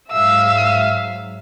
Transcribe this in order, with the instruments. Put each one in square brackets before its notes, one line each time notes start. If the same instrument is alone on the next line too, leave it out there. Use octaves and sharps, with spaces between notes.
[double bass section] G#2 F#3 [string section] E5 F5 [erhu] E6